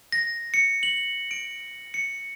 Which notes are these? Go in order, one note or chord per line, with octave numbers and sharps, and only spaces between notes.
A#6
C#7
F#7
D7
C#7